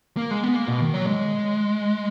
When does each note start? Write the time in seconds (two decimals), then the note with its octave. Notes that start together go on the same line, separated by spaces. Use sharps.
0.17 A#3
0.31 G#3
0.44 B3
0.56 A#3
0.68 B2
0.81 D#3
0.94 F#3
1.07 G#3